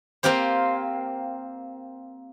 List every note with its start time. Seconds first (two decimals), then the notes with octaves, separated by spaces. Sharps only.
0.23 A#3 C4 F4 G4 C5